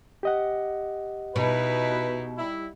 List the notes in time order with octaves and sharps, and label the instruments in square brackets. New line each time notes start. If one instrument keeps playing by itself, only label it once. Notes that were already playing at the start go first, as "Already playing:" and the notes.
[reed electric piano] G4 D#5 F#5
[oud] B2 [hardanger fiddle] D#4 E4 [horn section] B4
[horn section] G3 E4